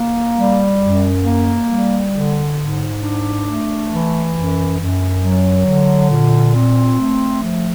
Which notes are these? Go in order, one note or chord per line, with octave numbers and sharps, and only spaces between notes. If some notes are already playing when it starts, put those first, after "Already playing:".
Already playing: A#3
G3
F#2
A#3
G3
D3
G#2
D4
A3
E3
F#2
F#2
F#3
D3
A#2
C4
A3
F3